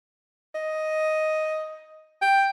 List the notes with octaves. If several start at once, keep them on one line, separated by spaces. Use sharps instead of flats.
D#5
G5